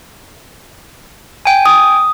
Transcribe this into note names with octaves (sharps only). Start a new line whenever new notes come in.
G5 G#5
D#6